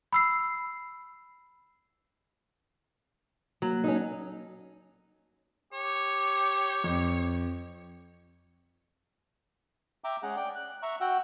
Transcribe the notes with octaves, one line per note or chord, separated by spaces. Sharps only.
B5 E6 C7
F#3 A#3
C#4 D#4
G4 C#5
F2
E5 G5 A#5 D6
G#3 C#4 G#4 F#5 A#5
D5 G5
F#6
E5 A#5 C#6
F#4 F#5 G5 E6